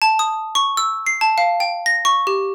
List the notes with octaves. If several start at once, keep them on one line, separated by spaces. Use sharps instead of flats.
A5
D#6
C#6
E6
C7
A5
F5
G5
A#6
C#6
G4